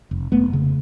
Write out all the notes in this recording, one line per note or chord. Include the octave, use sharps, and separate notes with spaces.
F1
F1 A3 B3
C#3